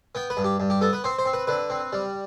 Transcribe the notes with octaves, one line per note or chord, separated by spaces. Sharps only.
B3 G5
B4
G2
G4
G2
G4
B3 A4
B4
C4 C5
C5
C4
B4
D3 B4
C4
G3